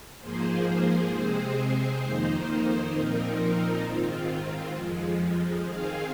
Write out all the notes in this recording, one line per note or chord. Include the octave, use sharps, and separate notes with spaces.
G#2 F3 A#3 G#4 C5
C3 G#3 C4 G#4 C5
F2 D#3 A#3 D#4 C5
A#2 F3 C4 D#4 A#4
G#2 D#3 C4 F4
F2 F3 G#3
D#3 C4 G#4 F5